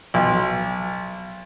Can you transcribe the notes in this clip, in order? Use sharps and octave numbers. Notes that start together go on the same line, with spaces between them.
B1